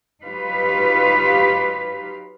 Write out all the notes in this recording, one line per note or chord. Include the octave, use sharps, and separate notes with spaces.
F#3 D#4 F4 G4 B4 F5